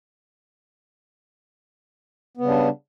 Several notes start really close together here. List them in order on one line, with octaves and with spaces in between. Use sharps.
B3 C#3 G3 D4